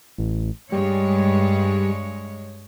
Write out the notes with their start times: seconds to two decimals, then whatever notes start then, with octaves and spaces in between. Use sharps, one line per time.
0.18 A1
0.72 G2 G3 G#3 C#5